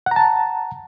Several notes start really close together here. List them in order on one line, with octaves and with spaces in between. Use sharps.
F#5 A#5 A5